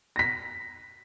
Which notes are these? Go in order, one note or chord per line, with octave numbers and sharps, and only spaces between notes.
A#6 B6